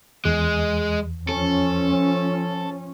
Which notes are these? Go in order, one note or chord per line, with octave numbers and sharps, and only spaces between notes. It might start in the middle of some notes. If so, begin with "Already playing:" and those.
E2 G#3
F3 C#4 A4